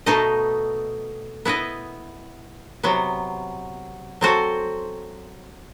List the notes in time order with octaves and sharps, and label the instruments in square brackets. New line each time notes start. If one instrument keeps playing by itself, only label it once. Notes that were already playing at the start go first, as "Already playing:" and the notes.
[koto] B2 A3 D#4 A4 D#5
B3 E4 B4 D#5
C3 F#3 B3
F#3 C4 F#4 A4 C5